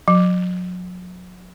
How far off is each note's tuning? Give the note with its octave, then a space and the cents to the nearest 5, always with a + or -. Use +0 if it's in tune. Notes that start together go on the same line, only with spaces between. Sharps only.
F#3 -35